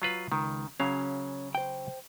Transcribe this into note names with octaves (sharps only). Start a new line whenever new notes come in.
F#3 F4 B4
C#2 D#3
C#3 F#3 C#4 F5
C5 G5